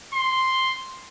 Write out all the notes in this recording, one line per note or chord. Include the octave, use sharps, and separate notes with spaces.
C6